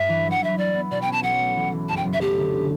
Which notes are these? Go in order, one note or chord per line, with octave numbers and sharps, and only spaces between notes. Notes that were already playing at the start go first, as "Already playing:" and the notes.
Already playing: G2 E5
E3
F#3 F#5
E4 E5
E4 D5
B3
B2 D5
G5
C#4
A5
B1 F#5
A3
E3
E3
F#1 A5
G5
F#1
E5
A3 G4
D3